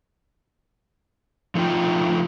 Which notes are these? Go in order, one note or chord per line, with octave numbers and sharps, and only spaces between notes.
F3 A3 D#4 F4 G5